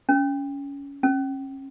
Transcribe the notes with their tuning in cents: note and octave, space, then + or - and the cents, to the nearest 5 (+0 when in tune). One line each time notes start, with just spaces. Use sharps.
C#4 +20
C#4 -35